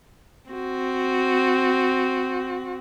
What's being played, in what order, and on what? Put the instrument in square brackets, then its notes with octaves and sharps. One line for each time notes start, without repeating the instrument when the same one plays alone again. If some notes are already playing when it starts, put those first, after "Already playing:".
[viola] C4 F#4